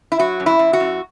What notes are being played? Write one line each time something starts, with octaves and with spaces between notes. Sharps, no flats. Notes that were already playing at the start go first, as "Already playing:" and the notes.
E4
F#3 F#4
F#2
E4
F#2
F#4
F#2